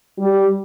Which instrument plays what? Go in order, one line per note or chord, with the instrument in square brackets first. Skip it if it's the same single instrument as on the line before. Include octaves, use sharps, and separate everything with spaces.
[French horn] G3